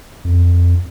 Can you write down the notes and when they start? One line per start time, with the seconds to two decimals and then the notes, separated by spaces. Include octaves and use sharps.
0.25 F2